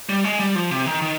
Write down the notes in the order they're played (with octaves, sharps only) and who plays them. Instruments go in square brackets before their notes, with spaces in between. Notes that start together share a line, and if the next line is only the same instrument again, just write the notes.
[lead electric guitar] G3
G#3
G3
F3
C3
D#3
D#3